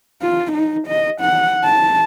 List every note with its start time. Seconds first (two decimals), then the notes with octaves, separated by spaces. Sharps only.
0.22 F4
0.52 D#4
0.87 D#5
1.21 F#5
1.64 A5